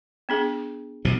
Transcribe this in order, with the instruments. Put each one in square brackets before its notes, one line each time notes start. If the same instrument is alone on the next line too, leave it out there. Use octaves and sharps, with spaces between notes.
[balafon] B3 D4 G#4
[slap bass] B1 B2